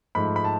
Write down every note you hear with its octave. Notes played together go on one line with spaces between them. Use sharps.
G#2 F3 A3 B5
B5
A5